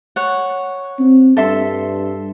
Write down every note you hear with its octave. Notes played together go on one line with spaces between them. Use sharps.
C#5 F#5
C4
G2 A4 E5 C6